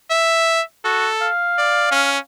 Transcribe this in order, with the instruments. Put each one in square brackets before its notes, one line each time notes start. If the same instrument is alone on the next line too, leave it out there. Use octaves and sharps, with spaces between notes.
[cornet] E5
[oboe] F#4 [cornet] A4
[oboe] F5
[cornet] D5
C#4